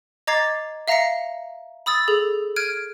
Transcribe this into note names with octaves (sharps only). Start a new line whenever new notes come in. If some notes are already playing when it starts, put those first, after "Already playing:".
D#5 A#5 D6 G#6 A6 C7
E5 F5 A#5 A#6 B6 C#7
B5 D#6 E6 A6
G#4 A4
F6 F#6 G#6 D7 D#7